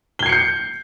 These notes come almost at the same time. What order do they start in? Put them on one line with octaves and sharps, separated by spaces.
G7 G#6 C7 C#7 G6